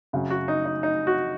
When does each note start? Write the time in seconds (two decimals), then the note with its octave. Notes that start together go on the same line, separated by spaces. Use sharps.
0.13 F#2 C#3
0.30 F#4
0.48 D#4
0.65 D#4
0.83 D#4
1.07 F#4